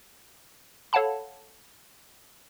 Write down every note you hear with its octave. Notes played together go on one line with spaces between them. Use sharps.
A4 C#5 F5 F#5 A5 B5